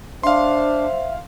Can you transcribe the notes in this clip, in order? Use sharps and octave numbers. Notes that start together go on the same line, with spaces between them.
D4 C5 E5 F5 C6